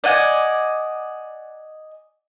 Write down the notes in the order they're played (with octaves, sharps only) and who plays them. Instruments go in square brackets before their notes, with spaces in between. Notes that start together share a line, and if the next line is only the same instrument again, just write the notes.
[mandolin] D5 D#5 F#5 G#5